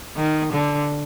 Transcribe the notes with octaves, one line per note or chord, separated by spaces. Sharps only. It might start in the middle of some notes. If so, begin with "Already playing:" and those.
D#3
D3